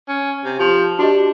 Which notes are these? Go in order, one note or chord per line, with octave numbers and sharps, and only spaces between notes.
C#4
C3
F3 G4
D4 F#4 G4 D#5